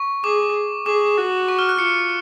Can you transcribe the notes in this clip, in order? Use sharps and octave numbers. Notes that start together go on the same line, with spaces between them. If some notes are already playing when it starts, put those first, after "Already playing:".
Already playing: C#6
G#4 D6
G#4 D6
F#4
C#6
F6
F#6
F4 C#7